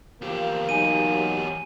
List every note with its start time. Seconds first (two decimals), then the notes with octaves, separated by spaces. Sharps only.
0.22 E2 F3 A#3 G4
0.69 F#3 D#4 G#5 D#7